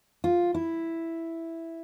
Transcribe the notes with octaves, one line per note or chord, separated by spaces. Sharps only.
F4
E4